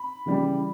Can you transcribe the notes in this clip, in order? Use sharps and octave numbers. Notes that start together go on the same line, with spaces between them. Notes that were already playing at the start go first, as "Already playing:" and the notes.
Already playing: B5
C#3 E3 G3